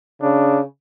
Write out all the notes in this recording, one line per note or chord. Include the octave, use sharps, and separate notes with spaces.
C#3 D4